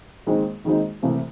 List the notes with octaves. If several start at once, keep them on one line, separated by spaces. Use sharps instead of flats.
D#2 D#3 G#3 C4 D#4
D#2 D#3 G#3 C4 D#4
C2 C3 E3 A3 C4